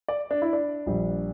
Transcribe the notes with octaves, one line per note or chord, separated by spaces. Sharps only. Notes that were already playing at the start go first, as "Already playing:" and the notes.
D5
D4
E4
D4
A#1 A#2 G3